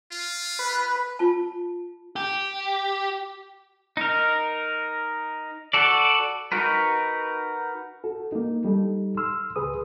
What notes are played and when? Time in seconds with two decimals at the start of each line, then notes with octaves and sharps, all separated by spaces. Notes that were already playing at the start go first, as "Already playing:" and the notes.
0.12 F4
0.59 B4
1.19 F4 A5
2.16 G4
3.97 D#4 A#4
5.73 F#4 A4 D5
6.52 D#4 F#4 A#4 B4
8.04 F#4 A4
8.32 A#3 D#4
8.65 G3 D#4 A4
9.17 C6 E6 F6
9.56 C#2 G#4 B4 D#6